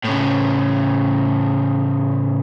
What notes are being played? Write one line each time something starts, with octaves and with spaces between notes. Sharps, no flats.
A2 C#3